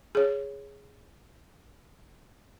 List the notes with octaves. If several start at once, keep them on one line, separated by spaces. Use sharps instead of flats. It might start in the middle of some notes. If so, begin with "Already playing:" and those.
G#4 C#5